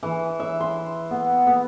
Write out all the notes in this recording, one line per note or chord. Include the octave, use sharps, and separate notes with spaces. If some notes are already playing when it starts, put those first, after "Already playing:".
E3
E5
C6
B3
B3